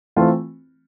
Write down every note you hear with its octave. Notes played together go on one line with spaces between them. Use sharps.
E3 A3 C4 F4